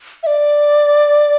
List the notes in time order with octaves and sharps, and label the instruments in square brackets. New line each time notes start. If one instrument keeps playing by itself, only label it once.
[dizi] E5
D5